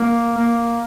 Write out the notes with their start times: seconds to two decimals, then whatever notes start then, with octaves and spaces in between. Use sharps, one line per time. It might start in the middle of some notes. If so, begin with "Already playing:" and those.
Already playing: A#3
0.38 A#3